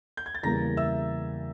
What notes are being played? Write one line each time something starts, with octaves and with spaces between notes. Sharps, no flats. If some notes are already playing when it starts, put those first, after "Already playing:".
G6
G#6
A6
E2 C#3 E3 G3 A#3 A#5 A#6
E5 E6